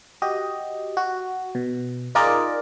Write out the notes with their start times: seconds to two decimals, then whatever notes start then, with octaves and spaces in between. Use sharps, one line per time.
0.22 F#4 G4 D#5
0.97 F#4
1.55 B2
2.15 D#4 F4 G#4 A#4 D5 D#5